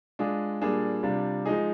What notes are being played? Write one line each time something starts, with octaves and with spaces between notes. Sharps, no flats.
G#3 D4 F4 G#4
A#2 G3 A#3 D4 G#4
C3 G3 D4 F4
F3 G#3 D#4 G#4